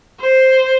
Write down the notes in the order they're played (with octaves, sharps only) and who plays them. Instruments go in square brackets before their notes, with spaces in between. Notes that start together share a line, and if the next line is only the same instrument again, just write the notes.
[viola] C5